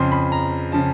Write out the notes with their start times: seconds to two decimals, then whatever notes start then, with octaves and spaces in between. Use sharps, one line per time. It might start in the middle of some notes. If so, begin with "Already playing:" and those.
Already playing: F2 C#3 F3 C6
0.12 B5
0.32 A#5
0.72 C#3 F3 A5